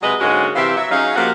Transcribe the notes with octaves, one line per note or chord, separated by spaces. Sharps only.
C3 F#3 G#3 B4 D#5
G#2 D3 G#3 A#3 C#4 F#4
C3 E3 C4 G4 E5 F5
F#3 E5
F#3 C#4 D#4 G#4 F5
F3 A#3 F#4 G4 F5